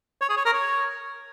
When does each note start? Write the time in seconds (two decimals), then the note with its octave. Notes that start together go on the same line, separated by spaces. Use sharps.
0.21 C#5
0.29 G#4
0.37 C#5
0.45 A#4
0.53 C#5